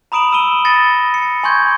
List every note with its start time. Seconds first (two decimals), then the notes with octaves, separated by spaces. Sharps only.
0.12 A#5 B5 D#6 D7 E7 F#7
0.32 E6 D#7 G7
0.65 B5 D#6 A6 A#6 C#7
1.14 C#7
1.43 G#5 C6 C#6 G6 G#6